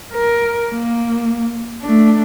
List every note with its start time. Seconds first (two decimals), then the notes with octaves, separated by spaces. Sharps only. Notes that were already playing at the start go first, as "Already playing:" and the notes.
0.13 A#4
0.72 A#3
1.83 A3 D4